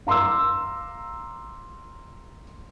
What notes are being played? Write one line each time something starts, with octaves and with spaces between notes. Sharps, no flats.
F5 A#5 C6 D6 E6